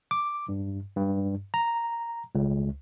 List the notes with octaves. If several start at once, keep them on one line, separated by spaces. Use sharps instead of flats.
D6
G2
G2
A#5
C#2